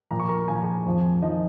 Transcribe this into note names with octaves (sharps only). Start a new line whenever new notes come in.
A#2 F3 A#5
C#6
A#4 A#5
A#2 F3 G#5
A#5
G#4 G#5
F2 F3
F3 D#4 D#5